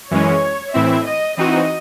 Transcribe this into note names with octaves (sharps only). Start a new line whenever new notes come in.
F#2 E3 G#3 C#4 C#5
A2 E3 C4 E4 E5
D#5
E3 C4 D#4 F#4 D#5